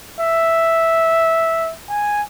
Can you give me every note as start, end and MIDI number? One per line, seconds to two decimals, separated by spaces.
0.21 1.73 76
1.90 2.22 80